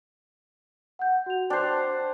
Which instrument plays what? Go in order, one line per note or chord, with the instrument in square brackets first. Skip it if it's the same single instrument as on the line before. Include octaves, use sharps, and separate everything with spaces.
[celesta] F#5 G6
F#4 F7
[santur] D4 C5 [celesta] G5 F#6 C7